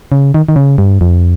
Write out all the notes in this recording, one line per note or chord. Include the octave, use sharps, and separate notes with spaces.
C#3
D#3
D#3
C#3
G2
F2